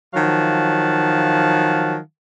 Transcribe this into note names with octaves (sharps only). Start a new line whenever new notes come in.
D#3 F3 F#3 F5 F#5 A5